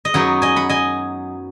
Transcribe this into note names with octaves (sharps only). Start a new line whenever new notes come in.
D#5
F#2 F#3 B3 D#4 C#5 F#5
D#5 G#5
F#5 B5
D#5 G#5